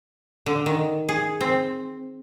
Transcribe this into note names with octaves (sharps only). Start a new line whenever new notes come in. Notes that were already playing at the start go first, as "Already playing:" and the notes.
D3
D#3
G#4
C4